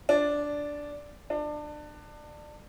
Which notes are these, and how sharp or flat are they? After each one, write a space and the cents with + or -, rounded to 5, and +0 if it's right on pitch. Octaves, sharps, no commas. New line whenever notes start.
D4 -5
D4 +25